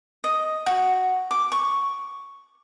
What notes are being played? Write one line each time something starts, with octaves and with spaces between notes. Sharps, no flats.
D#5
F#4
D6
C#6